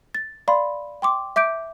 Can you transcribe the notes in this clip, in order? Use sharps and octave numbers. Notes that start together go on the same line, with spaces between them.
A6
D5 F5 B5 C6
G5 C6 D6
E5 D6 G6 D7